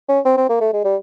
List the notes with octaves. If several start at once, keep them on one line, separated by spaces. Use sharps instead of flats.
C#4
C4
C4
A#3
A3
G#3
G3